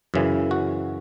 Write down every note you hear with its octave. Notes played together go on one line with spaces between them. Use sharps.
F#2 C#3 E3
F#4